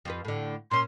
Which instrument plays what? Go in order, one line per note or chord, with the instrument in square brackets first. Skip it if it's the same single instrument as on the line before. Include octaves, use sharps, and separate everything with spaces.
[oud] F2 F3 B4
A2 D3
[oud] A#2 C#4 [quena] C6